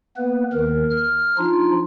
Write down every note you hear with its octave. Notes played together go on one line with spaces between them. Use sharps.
A#3 B3 B4
D#2 D#3 A#4
F6
F3 D4 D#4 F4